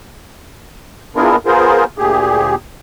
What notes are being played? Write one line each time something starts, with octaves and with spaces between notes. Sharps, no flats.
B3 D4 E4 F4 G#4 A#4
B3 F4 G#4 A#4 C5
D2 A#2 G4 G#4